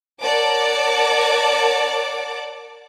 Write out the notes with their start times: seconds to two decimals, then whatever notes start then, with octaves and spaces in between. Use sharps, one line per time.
0.21 A#4 C#5 D5 F#5 A5 D6